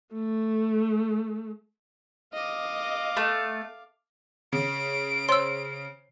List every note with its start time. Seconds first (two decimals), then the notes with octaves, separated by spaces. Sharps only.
0.14 A3
2.34 D#5 F5 D6
3.17 A3
4.53 C#3 D7
5.29 C5 C#5 C6 E6